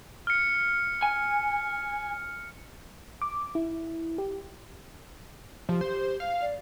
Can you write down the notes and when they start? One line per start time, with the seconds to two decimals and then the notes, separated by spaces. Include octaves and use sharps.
0.27 F6 C#7
1.02 G#5
3.22 D6
3.55 E4
4.18 G4
5.69 F3 G4
5.81 C5
6.20 F5
6.42 D5